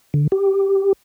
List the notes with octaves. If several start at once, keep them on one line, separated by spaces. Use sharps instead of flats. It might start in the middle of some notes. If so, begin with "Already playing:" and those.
D3
G4